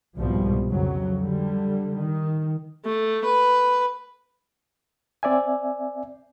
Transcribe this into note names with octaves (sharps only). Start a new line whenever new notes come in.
C2 G#2 B2 F3 G3
F2 C#3 F#3
D3 G3
D#3
A3
B4
C4 D5 E5 G#5